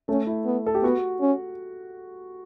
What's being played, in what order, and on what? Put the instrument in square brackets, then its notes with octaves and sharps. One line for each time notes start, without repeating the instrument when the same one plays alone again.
[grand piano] A3 [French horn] C#4
[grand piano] E4
[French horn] B3
[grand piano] A4
G4
[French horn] B3 [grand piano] F#4
[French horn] C#4